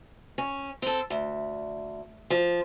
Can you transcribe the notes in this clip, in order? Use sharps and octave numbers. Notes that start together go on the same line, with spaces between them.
C#4
C4 A4
D2
F3